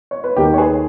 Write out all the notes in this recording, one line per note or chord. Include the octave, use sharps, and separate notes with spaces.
C#5
B4
D#2 D#3 G4 A#4
C#5
G#4 B4